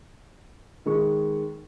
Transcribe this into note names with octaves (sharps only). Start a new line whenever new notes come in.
D#3 G#3 C#6